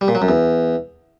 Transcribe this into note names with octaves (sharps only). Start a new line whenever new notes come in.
G3
A#2
F#3
F#2
E2